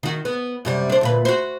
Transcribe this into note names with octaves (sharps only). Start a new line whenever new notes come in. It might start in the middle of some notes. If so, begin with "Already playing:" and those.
D#3 F#4
B3
F#2 C3 G3
D4 C5
D2 A#2 B4
F#4 C5